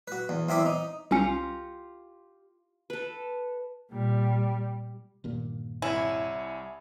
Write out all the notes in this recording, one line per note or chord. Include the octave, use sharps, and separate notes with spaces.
F#4 B4
E2
E2 C4 E4 B5 C6 D6
D#4
C2 C#4 F4 G4 A#5 C#7
A4 B4
A#2 G3
G1 D#2 A#2
C2 E4 C#5 G#5